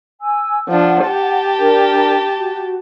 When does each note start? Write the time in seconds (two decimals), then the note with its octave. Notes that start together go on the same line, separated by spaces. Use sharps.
0.21 G#5 E6
0.69 F3 D4 F#5
1.06 G4 A5
1.59 D4 A#4
2.37 F#4